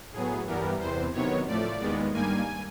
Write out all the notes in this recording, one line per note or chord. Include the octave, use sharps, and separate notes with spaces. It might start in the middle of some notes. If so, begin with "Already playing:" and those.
A2 F#3 B3 G#4
G2 E3 G3 B3 A#4
E2 C3 E3 C5
C3 D#3 F#3 B3 C#5
A2 F3 A3 D5
D#2 D#3 G#3 B3
G2 D#3 G3 A#3 G#5